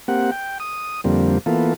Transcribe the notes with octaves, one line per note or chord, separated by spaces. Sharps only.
A#3 C4 G4 F#5
G5
D#6
F2 D3 G3 A#3 C4
E3 A#3 B3 F4 A4